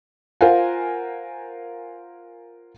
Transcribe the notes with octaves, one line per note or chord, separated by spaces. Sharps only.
F4 A#4 C5 F5 F#5 G#5